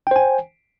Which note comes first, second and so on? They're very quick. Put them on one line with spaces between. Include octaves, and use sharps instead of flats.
G5 C5 G#5